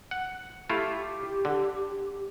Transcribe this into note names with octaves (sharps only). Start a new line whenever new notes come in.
F#5
A3 E4 F4 G4
D3